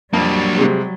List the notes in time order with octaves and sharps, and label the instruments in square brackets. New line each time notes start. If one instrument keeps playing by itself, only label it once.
[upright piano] F2 [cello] F#3 G3 [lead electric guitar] A#3 D4
[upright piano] C3 G#3